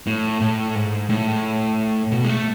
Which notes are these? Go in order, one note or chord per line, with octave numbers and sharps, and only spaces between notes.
A2
A2
G#2
A2
B2
G#3
A3